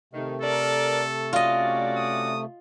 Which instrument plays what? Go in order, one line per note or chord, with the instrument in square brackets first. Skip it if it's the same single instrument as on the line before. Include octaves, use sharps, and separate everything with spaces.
[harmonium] C3 A3 [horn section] D#3
[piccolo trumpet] A4 [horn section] A#4 D5
[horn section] C#4 F#4 D5 [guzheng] F4 D#5
[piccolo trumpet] D#6